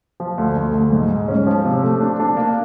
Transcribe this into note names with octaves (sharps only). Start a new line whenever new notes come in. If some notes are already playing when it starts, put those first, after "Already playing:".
F3
D2
D2
D2
G#2
G#2
C#4
F3
C3
A3
D4
D4
A#3